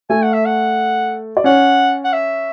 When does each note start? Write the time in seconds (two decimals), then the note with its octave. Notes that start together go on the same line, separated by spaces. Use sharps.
0.10 A3 A4 G#5
0.22 F#5
0.33 E5
0.45 F#5
1.37 D5
1.44 C#4 C#5 F#5
2.04 F#5
2.13 E5